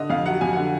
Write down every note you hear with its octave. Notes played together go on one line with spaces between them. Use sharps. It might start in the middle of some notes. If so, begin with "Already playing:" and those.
Already playing: D3 D#5
F2 F5
F#3 F#5
F2 G#5
D3 F#5